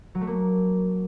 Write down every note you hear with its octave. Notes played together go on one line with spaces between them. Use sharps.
F#3
A3
A#3